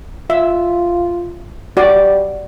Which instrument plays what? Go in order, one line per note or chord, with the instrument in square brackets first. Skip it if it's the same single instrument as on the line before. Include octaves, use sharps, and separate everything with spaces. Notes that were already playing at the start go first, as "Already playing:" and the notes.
[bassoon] F4 [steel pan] E5
[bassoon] G3 [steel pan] F#4 D5